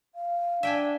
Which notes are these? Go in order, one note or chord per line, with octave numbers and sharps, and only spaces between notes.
F5
D4 E5 G5 G#5